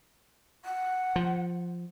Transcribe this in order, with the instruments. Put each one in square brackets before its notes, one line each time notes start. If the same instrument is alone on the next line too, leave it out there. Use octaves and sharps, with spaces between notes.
[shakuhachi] F#5
[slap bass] F3